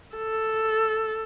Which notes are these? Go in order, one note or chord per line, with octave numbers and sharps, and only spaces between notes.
A4